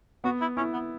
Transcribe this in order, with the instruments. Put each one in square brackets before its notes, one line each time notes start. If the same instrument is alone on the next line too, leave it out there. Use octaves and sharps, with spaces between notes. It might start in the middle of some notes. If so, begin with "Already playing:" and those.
[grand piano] B3 [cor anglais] F#4
[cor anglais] E4
[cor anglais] C#4 [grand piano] E4
[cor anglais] B3